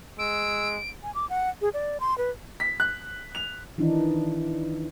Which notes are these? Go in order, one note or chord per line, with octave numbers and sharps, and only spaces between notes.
G#3 E6 D7
G#5
D6
F#5
G#4
D5
C6
B4
B6
F#6
F7
D#3 E3 D4 D#4